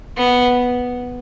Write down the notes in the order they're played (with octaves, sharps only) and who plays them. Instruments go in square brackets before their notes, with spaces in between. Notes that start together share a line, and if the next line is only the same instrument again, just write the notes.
[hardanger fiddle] B3